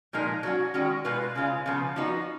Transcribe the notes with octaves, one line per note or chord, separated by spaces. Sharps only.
A#2 F3 G#3 D#4 A#4
F#3 C#4 F#4
D#3 G#3 C#4 F#4
B2 G#3 B3 F4 B4
C#3 G#3 C#4 F4
C#3 F3 B3
F3 B3 D#4 F#4